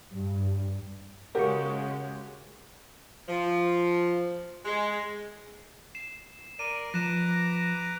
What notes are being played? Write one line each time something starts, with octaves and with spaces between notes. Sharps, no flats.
G2
C#3 G#3 F#4 G4 A#4 C#6
F3
G#3
C7 E7
A#4 D5 D#7
F3 B4 A#5 D6 A#6 E7